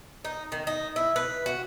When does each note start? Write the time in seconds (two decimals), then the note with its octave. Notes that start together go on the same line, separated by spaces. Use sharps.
0.25 D#4
0.52 D#3
0.67 D#4
0.96 E4
1.16 B4
1.46 F#4